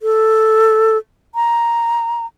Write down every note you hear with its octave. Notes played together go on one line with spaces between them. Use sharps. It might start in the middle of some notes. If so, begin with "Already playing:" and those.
A4
A#5